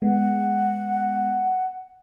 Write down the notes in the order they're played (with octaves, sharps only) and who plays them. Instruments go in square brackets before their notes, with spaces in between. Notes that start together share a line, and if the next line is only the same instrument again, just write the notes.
[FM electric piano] G#3 B3 [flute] F#5